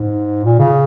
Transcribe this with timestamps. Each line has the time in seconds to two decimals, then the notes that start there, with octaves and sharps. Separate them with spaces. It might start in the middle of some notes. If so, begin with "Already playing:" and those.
Already playing: G#2
0.44 A#2
0.59 C#3